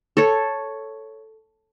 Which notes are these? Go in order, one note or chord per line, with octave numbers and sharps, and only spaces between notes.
A4 C#5